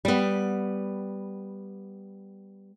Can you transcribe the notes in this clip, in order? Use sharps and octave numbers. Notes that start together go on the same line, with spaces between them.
G3 B3